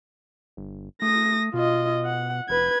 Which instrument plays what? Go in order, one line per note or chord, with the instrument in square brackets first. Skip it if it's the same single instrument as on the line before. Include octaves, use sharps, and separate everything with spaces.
[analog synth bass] G1
[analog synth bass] A3 [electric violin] D#6 A#6
[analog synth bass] B2 [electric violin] F4 D#5
[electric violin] F#5
[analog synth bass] F1 [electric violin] B4 G#6